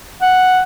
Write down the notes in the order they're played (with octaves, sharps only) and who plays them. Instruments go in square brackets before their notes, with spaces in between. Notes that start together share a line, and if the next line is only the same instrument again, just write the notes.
[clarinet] F#5